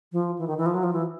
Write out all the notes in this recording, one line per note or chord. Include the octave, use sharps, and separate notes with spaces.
F3
E3
D#3
E3
F3
F#3
F3
E3